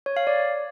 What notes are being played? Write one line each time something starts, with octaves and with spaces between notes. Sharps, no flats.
C#5
F5
D5